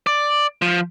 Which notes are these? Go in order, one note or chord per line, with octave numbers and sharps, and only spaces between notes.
D5
F3